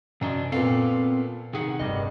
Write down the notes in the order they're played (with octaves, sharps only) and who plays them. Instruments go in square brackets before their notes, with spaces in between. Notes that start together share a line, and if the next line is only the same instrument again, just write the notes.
[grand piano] F#2 [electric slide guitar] C3 D4 D#5
[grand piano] A#2 B3 A4 [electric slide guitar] C4 F5
[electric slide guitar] C3 G#4 F#5 [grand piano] D#3
[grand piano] F1 G2 [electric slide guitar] D#5